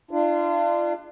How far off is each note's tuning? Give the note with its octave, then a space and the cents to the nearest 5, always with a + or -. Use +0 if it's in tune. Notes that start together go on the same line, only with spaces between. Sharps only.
D4 +25 F4 -30